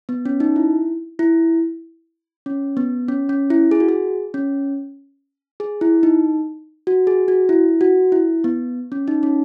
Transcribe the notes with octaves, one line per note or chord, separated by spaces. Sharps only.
B3
C#4
D#4
E4
E4
C#4
B3
C#4
C#4
E4
G#4
F#4
G#4
C#4
G#4
E4
D#4
F#4
G#4
F#4
E4
F#4
E4
B3
C#4
D#4
C#4